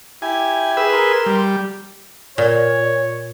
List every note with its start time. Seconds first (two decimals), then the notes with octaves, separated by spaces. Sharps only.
0.22 E4 G4 G#5
0.77 G#4 B4 E6
0.93 A#4 C6
1.26 G3
2.38 A#2 C#5